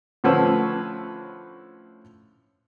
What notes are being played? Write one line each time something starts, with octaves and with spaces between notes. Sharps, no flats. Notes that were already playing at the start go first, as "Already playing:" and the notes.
A2 D3 F3 C#4 B4 E6